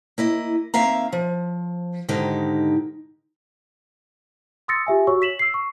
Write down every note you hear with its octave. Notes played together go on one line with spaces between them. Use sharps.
A#3 E4 D#5
D#3 A#3 C4 E5 F5 A#5
F3
G#2 D3 D#3 D#4 G4
C6 D#6 E6 A6 A#6 C#7
F4 G4 E5 G#5
F#4 C#5 C#6 E6
B6 E7 F#7
E6 C7
C#6